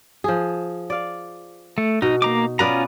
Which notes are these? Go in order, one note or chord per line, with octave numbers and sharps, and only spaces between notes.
F3 G#4
D5 F5
A3
B2 D#4
A#3 D#4 A#5 D6
B3 C#4 F4 B4 D5 A#5